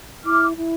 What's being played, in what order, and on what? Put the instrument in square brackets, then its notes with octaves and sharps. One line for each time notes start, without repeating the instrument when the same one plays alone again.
[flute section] E4 D6 F6
E4